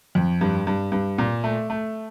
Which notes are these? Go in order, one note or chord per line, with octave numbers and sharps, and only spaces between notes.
F2
G2
G2
G2
A#2
A3
A3